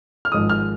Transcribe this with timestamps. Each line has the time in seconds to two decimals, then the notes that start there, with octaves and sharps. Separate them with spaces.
0.25 F6
0.32 G#1 G#2 F3 G#3 D#6
0.50 F6